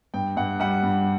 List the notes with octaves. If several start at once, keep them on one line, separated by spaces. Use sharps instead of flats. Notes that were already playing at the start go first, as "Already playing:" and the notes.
G2 G5
G2 F#5
G3 F#5
G2